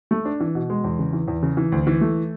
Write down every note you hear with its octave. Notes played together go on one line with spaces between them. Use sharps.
A3
D4
E3
B2
G#3
E2
C#3
E3
E2
C#3
E3
D2
E3
A3